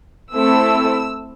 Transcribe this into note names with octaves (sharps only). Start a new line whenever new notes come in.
A3 C4 E4 A4 E6